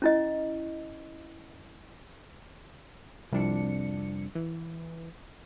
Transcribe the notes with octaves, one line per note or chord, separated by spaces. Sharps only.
C#4 E4 D#5
C2 F2 D4 C#7
E3